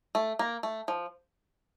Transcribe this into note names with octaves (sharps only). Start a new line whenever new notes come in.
A3
A#3
A3
F3